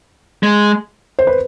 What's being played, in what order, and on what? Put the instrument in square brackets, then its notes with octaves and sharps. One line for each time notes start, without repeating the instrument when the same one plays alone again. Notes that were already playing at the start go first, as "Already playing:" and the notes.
[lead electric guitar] G#3
[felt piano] C5
B4